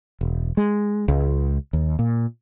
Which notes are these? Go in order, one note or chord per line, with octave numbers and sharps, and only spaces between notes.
E1
G#3
C#2
D#2
A#2